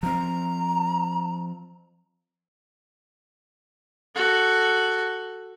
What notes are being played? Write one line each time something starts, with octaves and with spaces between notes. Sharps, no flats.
F3 C4 A#5
F#4 A4